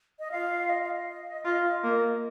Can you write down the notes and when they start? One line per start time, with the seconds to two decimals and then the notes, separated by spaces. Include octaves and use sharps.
0.19 D#5
0.31 F4 F5
0.69 D#5
0.81 F5
0.93 D#5
1.45 F4
1.83 A#3